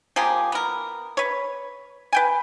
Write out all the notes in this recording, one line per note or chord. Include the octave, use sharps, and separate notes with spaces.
F3 A#3 G4 G#4
B3 A#4
B4 C#5
B4 G5 G#5